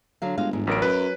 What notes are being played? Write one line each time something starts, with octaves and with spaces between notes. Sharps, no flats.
D3 F#3 F5
G1 G#3 F#4 F5
E2 G#2
A1 F#3 C#4 A#4 D7
F#2 B4